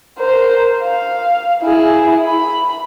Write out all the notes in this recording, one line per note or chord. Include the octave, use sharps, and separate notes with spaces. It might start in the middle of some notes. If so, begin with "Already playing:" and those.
A#4 C5
F5
E4 G#4
B5